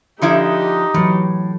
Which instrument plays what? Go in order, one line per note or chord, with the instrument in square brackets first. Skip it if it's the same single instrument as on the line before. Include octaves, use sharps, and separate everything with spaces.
[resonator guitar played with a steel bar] D3 F3 E4 [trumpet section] D#4 [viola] G4
[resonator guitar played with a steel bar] A2 [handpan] E3 F#3